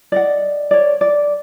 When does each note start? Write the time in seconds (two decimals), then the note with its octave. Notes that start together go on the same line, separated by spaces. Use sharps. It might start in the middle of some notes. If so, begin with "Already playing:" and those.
0.12 D5 D#5 F#5
0.71 C#5 D5
1.01 D5